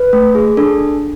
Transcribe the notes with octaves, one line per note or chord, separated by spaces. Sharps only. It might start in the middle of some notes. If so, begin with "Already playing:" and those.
Already playing: B4
A3
G#4
D4 A4